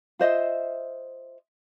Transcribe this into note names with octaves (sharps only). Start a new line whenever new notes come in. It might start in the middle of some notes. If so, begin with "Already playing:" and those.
F4 C5 D#5 E5